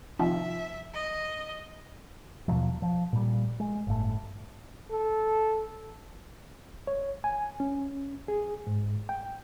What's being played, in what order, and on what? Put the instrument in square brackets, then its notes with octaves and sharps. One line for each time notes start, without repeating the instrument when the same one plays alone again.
[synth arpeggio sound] C3 D#3 F3 [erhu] E5
[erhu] D#5
[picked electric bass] D#2 B2 F3 F#3
F3
A#2 G3
G#3
G1 A2
[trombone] A4
[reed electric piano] C#5
G#5
C#4
G#4
G#2
G5